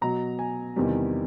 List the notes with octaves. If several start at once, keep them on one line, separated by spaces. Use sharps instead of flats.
B2 F#3 A#5
G#5
E2 C3 D#3 G3